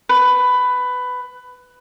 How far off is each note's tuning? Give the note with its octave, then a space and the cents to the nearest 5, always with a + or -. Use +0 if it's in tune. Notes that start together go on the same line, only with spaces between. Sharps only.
B4 +15